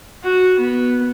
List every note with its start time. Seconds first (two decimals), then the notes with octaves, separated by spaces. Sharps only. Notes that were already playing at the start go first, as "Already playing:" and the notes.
0.23 F#4
0.59 B3